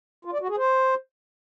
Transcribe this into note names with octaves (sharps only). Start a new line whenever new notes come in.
F4
D5
F#4
G#4
C5